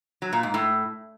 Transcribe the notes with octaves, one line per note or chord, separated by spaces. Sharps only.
F#3
A#2
G#2
A2